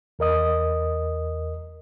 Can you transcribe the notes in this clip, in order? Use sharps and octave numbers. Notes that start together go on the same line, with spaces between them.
E2 A#4 D#5 D#6